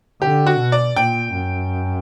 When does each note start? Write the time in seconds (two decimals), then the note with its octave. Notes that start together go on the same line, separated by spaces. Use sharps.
0.22 D3 G4
0.47 F#4
0.59 B2
0.72 D5
0.96 A#2 G5
1.34 F#2